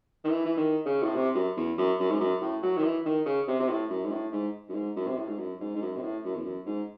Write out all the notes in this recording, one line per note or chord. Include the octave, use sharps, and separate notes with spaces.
D#3
E3
E3
D#3
C#3
A2
C3
F#2
E2
F#2
F#2
G#2
F#2
A2
F#3
D#3
E3
D#3
C#3
C3
C3
A2
F#2
G#2
A2
G#2
F#2
G#2
F#2
C3
A2
G#2
F#2
G#2
G#2
F#2
C3
A2
F#2
E2
F#2
G#2